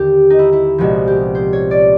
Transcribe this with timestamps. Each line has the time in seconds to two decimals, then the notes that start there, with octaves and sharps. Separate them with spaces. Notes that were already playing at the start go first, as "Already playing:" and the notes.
Already playing: D#2 D3 G3 G4
0.30 D#4
0.39 E4
0.53 E4
0.78 C2 A#2 F3 G#3 B3 F#4
1.07 G4
1.35 C5
1.53 C#5
1.71 D5